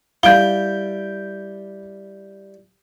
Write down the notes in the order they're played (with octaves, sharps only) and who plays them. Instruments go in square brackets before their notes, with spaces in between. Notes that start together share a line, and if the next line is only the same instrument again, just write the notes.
[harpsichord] G3 E4 [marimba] F5 [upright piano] G6 D7 G7